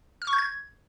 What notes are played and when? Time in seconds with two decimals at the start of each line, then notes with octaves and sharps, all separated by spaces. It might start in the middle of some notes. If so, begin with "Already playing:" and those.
0.22 F6
0.27 C#6
0.33 G6
0.38 G#6